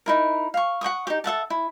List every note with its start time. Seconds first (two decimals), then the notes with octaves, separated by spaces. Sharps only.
0.06 D#4 E4 A#4
0.54 F5 C#6
0.81 F#5 G5 C#6 D#6
1.07 D#4 G4
1.24 A4 E5 F#5 A5
1.50 E4